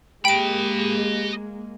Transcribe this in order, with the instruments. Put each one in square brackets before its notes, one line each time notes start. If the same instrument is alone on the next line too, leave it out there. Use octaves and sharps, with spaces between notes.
[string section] G#3 A#3 [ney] G4 [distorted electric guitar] D#5 B5 [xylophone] G5 D7